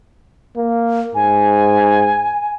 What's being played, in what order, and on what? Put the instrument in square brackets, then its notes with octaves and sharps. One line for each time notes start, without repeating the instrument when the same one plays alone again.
[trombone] A#3
[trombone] G#2 [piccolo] G#5